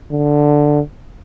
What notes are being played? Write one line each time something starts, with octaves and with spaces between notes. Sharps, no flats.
D3